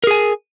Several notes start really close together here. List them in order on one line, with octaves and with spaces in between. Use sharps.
A#4 G#4 G#5